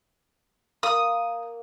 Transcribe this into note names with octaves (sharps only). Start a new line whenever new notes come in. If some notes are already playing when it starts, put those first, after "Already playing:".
A#3 D#6